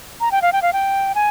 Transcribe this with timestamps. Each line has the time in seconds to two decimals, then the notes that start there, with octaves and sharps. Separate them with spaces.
0.21 A#5
0.32 G5
0.42 F5
0.53 G5
0.62 F5
0.73 G5
1.15 G#5